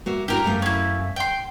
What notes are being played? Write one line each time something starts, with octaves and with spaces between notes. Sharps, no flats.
A#3 F#4 E5
D4 E4 F#4 G4 A#4
F#2 A3 F5
C#4 E4
G5 C6